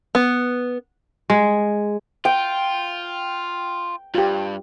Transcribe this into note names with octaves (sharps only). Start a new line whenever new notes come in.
B3
G#3
F4 G5
G2 F4 G4